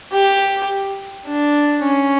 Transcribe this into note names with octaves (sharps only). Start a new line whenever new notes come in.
G4
D4
C#4